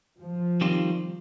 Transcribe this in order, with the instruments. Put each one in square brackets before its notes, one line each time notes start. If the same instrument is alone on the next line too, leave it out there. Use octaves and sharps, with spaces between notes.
[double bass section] F3
[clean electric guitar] D#3 G3 C4 F4